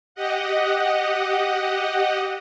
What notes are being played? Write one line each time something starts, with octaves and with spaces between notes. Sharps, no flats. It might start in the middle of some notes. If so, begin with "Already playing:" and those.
G4 D#5 F#5